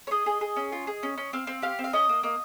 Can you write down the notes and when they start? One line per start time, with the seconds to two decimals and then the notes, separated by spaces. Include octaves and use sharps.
0.07 C#5
0.11 G#4 D#5
0.26 G#4
0.41 G#4
0.56 C#4
0.72 F4
0.87 G#4
1.03 C#4
1.18 C#4
1.33 C4 F5
1.47 C4
1.62 G4 F5
1.79 C4
1.84 F5
1.93 C#4 D#5
2.09 A#3
2.23 A#3 D#5